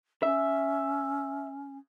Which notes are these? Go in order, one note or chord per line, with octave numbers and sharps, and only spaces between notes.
C#4 E5